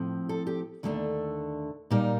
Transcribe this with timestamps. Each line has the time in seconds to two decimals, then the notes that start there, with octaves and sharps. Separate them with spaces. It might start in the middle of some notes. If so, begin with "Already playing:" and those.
Already playing: A2 F3 C4
0.29 A4
0.47 G4
0.83 D#2 D3 A3 D4
1.90 A#2 G3 A#3 D#4 A#4